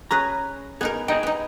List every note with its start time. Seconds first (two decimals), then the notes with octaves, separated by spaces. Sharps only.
0.11 C#4 G#4 B4 A#5
0.81 B3 D#4 G#4 A#4
1.08 D#4 G#4 D#5 G5
1.23 B3 D#4